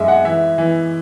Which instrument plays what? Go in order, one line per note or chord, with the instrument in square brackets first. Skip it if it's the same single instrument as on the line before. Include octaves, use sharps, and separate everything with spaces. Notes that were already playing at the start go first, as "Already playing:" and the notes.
Already playing: [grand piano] F#2 G#3 E5
F#5
E3 E5
E3